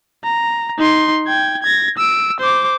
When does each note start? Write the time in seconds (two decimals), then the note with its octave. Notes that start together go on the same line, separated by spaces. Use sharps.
0.24 A#5
0.78 D#4 C6
1.27 G5 G#6
1.62 G#6 A#6
1.98 E6 D7
2.40 C5 D6